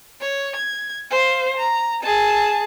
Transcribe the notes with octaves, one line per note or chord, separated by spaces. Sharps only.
C#5
G#6
C5 F5
A#5
G#4 A5